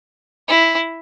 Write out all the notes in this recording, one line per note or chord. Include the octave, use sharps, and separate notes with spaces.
E4